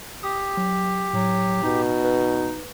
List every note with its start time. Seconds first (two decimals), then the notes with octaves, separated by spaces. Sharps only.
0.23 G4 D#6
0.57 F#3
1.13 A2 F#3
1.63 B2 D#4
2.04 B4